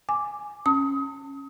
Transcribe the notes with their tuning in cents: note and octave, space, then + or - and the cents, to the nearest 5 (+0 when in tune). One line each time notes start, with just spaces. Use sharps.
G#5 +0 D6 +0
C#4 -10 A5 +35 D#6 +30